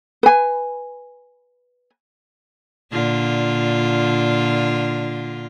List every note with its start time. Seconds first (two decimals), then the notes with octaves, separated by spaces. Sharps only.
0.23 B4 G#5
2.92 A#2 D3 F4